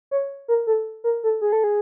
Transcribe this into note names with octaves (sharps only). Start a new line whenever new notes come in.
C#5
A#4
A4
A#4
A4
G#4
A4
G#4